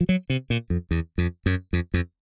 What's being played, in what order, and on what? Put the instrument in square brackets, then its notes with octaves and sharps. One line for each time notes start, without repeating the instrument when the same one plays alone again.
[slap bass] F3
F#3
C3
A#2
F2
E2
F2
F#2
F2
F2